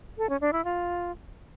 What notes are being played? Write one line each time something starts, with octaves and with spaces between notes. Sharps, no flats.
A4
C#4
D4
E4
F4